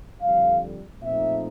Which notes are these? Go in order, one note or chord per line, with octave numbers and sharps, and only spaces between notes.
F2 D3 G3 F5
A#2 F3 A3 C4 D#4 E5